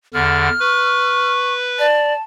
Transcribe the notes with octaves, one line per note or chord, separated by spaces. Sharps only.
E2 D3 F6
B4 C#6
D5 A5